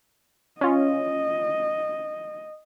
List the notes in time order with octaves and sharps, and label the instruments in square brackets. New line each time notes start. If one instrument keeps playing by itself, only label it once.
[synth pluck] C#4 F4 [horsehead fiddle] D#5